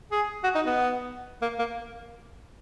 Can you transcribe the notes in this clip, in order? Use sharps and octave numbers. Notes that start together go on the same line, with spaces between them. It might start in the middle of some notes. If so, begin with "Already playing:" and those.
G#4
F#4
D#4
B3
A#3
A#3